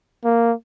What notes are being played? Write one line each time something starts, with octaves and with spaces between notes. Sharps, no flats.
A#3